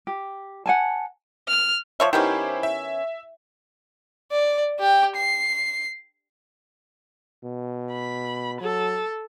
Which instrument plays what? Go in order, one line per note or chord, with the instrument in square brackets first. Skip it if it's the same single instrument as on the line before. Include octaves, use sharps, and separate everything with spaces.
[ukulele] G4
F#5 G#5 A5
[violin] F6
[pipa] F3 C#5 E5
[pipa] D#3 B3 C#4 [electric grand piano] E4 G4 C5
[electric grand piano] E5
[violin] D5
G4 G5
C7
[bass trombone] B2
[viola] B5
[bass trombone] F#3 [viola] A4